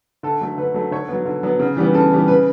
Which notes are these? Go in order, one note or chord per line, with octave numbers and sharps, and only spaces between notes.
D3 A4
F#3 A3
D3 B4
F#3 A3
D3 C#5
F#3 B3
D3
F#3 B3
C#3
E3 G3 B3
C#3 A4
E3 G3 B3
C#3 B4